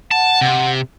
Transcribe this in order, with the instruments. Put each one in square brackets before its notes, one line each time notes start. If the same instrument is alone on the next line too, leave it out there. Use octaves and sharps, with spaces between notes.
[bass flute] F#5 [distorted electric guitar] A5
[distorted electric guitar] C3